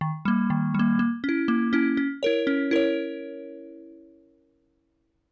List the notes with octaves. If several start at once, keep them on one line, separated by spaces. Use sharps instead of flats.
D#3
G3 A#3
D#3
G3 A#3
A#3
C#4 E4
A#3
C#4 E4
C#4
E4 A#4 C#5
C#4
E4 A#4 C#5